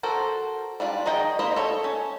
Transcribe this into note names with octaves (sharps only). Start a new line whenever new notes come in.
F#4 A4 A#4 C5
G3 D4 F4 D5
D#3 D#4 G#4 D#5 G5
A#3 F4 C5 D#5 B5
A4 C#5
C#4